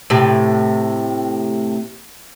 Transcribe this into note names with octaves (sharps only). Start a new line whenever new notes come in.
A2 C3